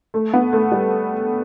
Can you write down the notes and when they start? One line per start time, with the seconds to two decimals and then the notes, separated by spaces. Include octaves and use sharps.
0.14 A3
0.33 B3
0.53 A3
0.72 G3